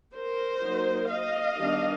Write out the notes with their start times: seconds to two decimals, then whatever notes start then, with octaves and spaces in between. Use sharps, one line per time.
0.13 A#4 C5
0.61 F#3 A#3 D#4
1.10 D#5 F5
1.58 D#3 G3 B3 D4